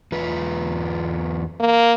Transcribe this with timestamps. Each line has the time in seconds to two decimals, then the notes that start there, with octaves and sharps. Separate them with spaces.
0.12 E2 F4 B4
1.60 A#3